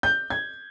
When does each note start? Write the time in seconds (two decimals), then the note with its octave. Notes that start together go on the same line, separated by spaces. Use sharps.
0.03 G6
0.30 G#6